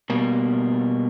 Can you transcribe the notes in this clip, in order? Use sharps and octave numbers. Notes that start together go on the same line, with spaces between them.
B2 G3 A#3